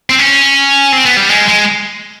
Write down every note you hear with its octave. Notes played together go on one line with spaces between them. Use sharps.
C4
C#4
C4
B3
G3
G#3
G#3